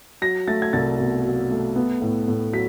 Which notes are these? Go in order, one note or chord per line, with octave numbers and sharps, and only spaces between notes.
F#3 A#6
A3 A6
G#6
C2 A6
B2
F#3
A3
B3
A2
A2
F#3 B6